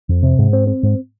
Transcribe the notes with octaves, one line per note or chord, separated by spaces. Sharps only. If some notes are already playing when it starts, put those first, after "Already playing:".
F2
C3
G#2
C4
C4
G#2